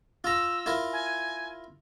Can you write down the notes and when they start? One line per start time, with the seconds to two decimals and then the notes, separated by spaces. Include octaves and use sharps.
0.24 F4 A#5 E6
0.66 E4 F4 A#4
0.93 G#5